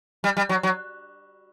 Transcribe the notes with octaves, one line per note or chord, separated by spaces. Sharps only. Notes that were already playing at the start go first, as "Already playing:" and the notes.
G3
G3
F#3
F#3